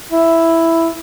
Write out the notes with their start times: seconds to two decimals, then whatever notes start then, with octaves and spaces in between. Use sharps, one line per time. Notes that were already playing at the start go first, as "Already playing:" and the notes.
0.11 E4